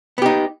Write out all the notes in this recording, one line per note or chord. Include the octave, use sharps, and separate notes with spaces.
B3 D#4 G4